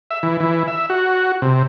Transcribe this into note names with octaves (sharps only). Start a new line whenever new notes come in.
E5
E3
E3
E5
F#4
C3